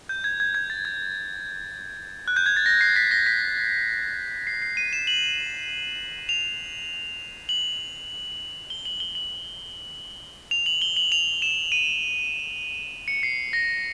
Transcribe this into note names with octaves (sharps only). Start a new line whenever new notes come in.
G6
G#6
G#6
G#6
A6
G#6
F#6
G6
G#6
A6
A#6
C7
B6
A#6
B6
C7
C7
D#7
E7
F#7
F7
F#7
G7
F#7
G7
F#7
F7
F#7
G7
F#7
F7
E7
D#7
C#7
C7
A#6